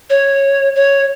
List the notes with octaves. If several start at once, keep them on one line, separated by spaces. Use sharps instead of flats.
C#5
C#5